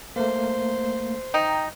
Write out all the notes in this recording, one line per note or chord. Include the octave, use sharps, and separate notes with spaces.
A3 A#3 C5
D#4 G5 A#5